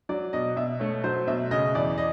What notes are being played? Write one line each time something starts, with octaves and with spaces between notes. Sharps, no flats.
F#3 D5
B2 D#5
B2 E5
A3 C#5
F#3 C5
B2 E5
C#3 D#5
E2 D5
D#5